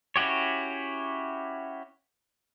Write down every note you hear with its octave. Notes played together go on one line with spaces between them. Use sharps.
C#4 E4 F#4 G4 C#5